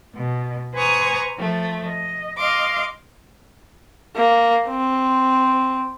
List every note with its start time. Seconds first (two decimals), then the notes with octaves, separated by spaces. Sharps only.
0.16 B2
0.75 B4 C5 G#5 A#5 C#6 D#6
1.39 F3 A3
1.87 D#5
2.38 D#5 F5 C6 D6
4.16 A#3
4.68 C4